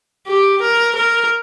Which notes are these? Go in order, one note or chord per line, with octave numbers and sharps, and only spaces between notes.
G4
A#4
A#4